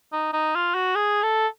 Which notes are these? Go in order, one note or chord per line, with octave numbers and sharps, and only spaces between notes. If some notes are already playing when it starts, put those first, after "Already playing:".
D#4
D#4
F4
F#4
G#4
A4